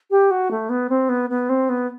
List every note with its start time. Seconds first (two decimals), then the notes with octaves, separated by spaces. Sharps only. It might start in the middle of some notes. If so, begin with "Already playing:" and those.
0.11 G4
0.31 F#4
0.51 A3
0.69 B3
0.90 C4
1.09 B3
1.30 B3
1.49 C4
1.69 B3